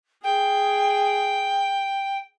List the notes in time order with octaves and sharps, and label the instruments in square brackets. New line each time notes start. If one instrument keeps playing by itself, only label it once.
[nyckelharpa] G#4 [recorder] G5